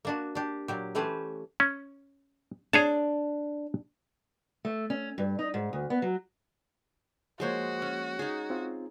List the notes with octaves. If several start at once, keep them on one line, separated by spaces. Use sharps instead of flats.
A#3 D4 F#4
D4 G4
A#2 F#3 G4
E3 A3 C#4 G4 B4 C5
C#4
D4 G#4 C#5 A5
A3
C#4
G2
D#4
G#2
D2
B3
F#3
F3 G#3 A#3 F#4 C5 C#5
C#4
D#4 G#4
C4 F4